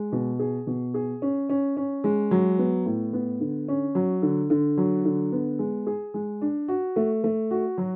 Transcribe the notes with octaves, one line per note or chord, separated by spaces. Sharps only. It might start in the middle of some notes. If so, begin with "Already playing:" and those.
Already playing: G#3
B2
G#4
B2
G#4
C#4
C#4
C#4
G#3
F#3
B3
A2
B3
D3
C#4
F#3
D3
D3
F#3
D3
B3
G#3
G#4
G#3
D4
F#4
A3
A3
F#4
F#3